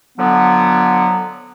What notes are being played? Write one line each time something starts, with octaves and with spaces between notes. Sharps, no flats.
D3 F3 F#3 B3